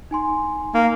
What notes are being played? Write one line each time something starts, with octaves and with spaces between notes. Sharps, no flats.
D#4 G#5 C6
A#3 D#4